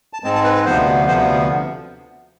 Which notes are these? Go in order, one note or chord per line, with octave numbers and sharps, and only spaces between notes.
A5
G#2 G#3 C4 A5
A5
B4
B4
D2 C3 F3 B3 C5
D2 C3 F3 B3 C5